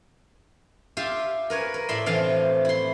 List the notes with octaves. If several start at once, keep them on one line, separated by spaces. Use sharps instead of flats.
F4 G4 E5 F5
A#4 B4 C#5 G#5
A#4
A2 D5 E5 A5 B5 C6
C3 E3 F3 F4 F5 A5
E4 C6